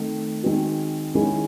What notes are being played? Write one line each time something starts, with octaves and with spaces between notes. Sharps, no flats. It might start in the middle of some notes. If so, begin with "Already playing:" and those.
Already playing: D#3 A3 C4
D#3 G#3 C4 F#4
D#3 G#3 C#4 E4 G#4